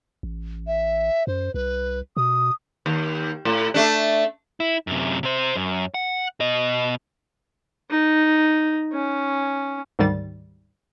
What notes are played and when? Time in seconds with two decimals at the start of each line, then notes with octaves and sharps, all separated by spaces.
0.23 A1
0.67 E5
1.27 F#2 C5
1.54 C2 B4
2.17 B2 D#6
2.86 D#2
3.45 A2
3.74 A3 D4
4.60 E4
4.87 F#2 C3
5.23 C3 C5
5.56 F#2
5.94 F#5
6.40 B2 D#5
7.90 D#4
8.93 C#4
9.99 D2 G#2 D#3 G3 A6